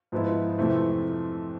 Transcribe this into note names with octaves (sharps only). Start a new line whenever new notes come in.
G#2 F3 G#3 B3 E4
F2 C3 E3 A3 C4